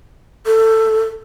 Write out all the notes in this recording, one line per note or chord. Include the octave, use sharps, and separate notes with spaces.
A4